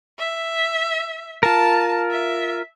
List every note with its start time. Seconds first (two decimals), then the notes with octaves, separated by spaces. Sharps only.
0.19 E5
1.43 F4 A#4 A5
2.11 E5